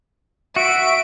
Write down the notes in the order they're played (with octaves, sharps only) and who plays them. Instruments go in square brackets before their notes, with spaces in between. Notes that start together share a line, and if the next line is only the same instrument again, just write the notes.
[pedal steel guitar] F#4 [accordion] E5 [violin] D7